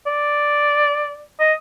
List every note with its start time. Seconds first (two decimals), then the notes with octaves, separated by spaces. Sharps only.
0.07 D5
1.40 D#5